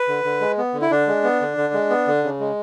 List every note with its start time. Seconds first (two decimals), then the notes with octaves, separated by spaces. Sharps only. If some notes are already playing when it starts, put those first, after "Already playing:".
Already playing: B4
0.08 D3
0.24 D3
0.41 G#3
0.58 B3
0.74 D3
0.82 E4
0.91 D3 D4
1.07 G#3
1.24 B3
1.41 D3
1.57 D3
1.73 G#3
1.90 B3
2.07 D3
2.24 C#3
2.40 G#3